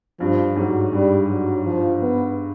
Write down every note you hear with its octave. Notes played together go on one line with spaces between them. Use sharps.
G2 F3
G#2 F#3
G2 G3
F#3
F3
B3